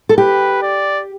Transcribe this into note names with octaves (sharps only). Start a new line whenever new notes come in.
A4
G4 B4
D5